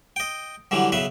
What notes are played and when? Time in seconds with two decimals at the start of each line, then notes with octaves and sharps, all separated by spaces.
0.16 D#5 G5
0.71 D3 E3 F#3 G3
0.92 B1 C#3 B4 E5